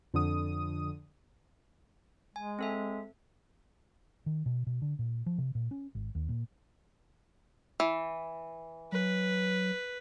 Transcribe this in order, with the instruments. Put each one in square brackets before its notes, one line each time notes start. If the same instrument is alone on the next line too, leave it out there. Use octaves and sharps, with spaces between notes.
[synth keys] F2 D3 D#6
[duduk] G#3 [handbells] G#5
[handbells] C4 A4 E5
[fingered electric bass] D#3
B2
B2
D3
A#2
F3
C3
A#2
C#4
G#1
D#2
A#2
[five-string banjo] E3
[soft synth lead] F#3 [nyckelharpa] B4